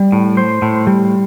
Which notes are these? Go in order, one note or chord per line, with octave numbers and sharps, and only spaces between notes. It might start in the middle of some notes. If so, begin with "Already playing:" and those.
Already playing: G3
A2
C5
A2
G3